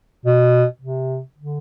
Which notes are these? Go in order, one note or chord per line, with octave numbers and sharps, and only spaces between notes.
B2
C3
D3